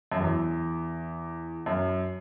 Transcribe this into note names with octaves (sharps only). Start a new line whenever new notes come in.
F#2
E2
F#2